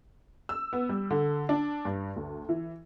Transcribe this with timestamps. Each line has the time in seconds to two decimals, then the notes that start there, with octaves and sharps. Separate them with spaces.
0.49 E6
0.73 B3
0.89 G3
1.10 D3
1.49 D4
1.85 G2
2.16 D2
2.49 E3